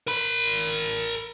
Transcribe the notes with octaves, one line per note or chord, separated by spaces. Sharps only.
A#4 B5